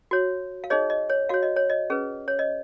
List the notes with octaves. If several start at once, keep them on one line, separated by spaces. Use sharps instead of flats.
F#4 C#5
F5
D#4 G#4 C#5 D#5
D#5
C#5
F#4 C#5 F5
D#5
C#5
D#5
C#4 G#4 B4
C#5
D#5